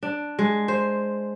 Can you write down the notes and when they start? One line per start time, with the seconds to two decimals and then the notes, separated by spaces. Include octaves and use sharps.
0.03 D4
0.39 G#3
0.68 C5